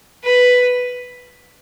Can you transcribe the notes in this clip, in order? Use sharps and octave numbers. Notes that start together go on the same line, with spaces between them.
B4